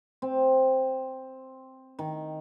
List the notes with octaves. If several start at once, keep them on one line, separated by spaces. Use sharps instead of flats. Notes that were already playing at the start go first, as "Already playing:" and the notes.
C4
D#3